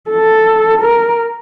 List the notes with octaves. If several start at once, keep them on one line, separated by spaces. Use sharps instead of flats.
A4
A#4